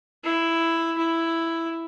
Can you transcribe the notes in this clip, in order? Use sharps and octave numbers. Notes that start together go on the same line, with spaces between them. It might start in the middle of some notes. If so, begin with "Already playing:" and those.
E4
E4